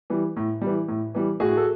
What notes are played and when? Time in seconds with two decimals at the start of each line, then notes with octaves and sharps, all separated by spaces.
0.10 E3 G3
0.36 A2
0.61 E3 G3
0.88 A2
1.15 E3 G3
1.40 A2 F#4 G#4
1.57 A4